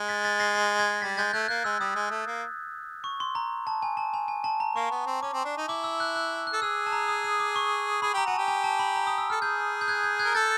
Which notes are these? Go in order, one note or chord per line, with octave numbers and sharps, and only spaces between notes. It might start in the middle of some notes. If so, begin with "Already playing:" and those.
Already playing: G#3
A6 B6
A6 B6
A#6 C7
A#6 C7
G#6 A#6
G3 A6 B6
G#3 G6 A6
A3 F#6 G#6
A#3 F#6
G#3 E6
G3 D#6
G#3
A3
A#3
C#6
C6
A#5
A5
G#5
A5
G#5
G#5
A5
A#5
A#3 C#6
B3
C4
C#4 D6
C4
D4
D#4
E4 D6
E6
F#6
F#6
F#6
A4
G#4 E6
A5
A#5
D#6
D#6
D6
C#6
G#4 B5
G4 A#5
F#4 G#5
G4 A5
G#5
A5
B5
A#5
D#6
E6
A4 F6
G#4 G6
G6
F#6 G#6
G6
F#6 G#6
A#4
A4 G6 A6